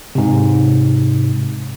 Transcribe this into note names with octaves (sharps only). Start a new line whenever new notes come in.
G#2 C3